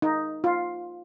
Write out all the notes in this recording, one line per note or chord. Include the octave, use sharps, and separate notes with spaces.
D#4
F4